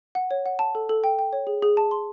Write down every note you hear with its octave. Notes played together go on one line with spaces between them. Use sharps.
F#5
C#5
F#5
A5
A4
A4
G5
G5
C#5
G#4
G#4
A5
C6